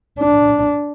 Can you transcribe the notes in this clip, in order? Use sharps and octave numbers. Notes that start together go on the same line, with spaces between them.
D4